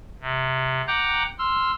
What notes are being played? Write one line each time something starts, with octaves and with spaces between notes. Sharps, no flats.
C3
F#5 G5 A#5 D6 F#6 G6
C6 E6 F6